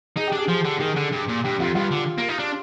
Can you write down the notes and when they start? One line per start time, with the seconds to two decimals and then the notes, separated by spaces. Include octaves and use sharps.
0.16 D#4 G#4
0.27 D4 G4
0.38 G#4
0.48 F3
0.64 D3
0.80 D#3 G#4
0.96 D3
1.12 G2
1.28 A#2
1.44 G2 G4
1.59 F2 F4
1.75 G2 F4
1.91 D3
2.18 A#3
2.29 D#4
2.39 D4